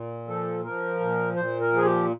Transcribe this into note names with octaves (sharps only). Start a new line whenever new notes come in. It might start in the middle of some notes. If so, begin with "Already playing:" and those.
Already playing: A#2
F3 A4
F3 A#4
A#2
A#2 C5
A#4
F3 G#4
G4